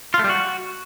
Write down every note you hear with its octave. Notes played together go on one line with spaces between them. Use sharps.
F4
A3
G3
F#4